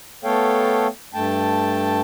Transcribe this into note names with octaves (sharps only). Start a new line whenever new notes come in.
A3 B3 A4 C#5 F5 G5
G2 A3 G5 A5